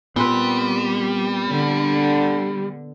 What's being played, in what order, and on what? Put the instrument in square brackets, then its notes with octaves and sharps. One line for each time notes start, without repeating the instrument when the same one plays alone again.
[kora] A#2 C4 B4 [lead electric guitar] G3 [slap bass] B3
[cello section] D3